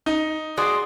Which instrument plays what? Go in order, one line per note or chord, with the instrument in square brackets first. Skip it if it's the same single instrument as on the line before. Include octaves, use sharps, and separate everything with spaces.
[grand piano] D#4
[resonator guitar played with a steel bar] F#4 G#4 D5 [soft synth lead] C6 [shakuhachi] D#6